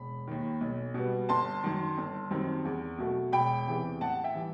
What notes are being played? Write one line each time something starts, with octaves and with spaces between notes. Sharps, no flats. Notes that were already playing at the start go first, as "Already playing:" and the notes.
Already playing: E1 B5
D#2 D#3
B1
B2 G3 B3
G1 A5 C6
F#2 D#3
G1
F#2 D#3 G3 C4
E2
B2 F#3 A3
E1 G5 B5
E2 C3 E3
A1 F#5 A5
E5 G5
E3 G3